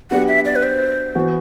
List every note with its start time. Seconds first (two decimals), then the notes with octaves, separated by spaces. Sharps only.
0.11 F#3 B3 D4 G4 F#5
0.28 E5
0.45 D5
0.56 B4
0.63 C5
1.15 E3 B3 F#4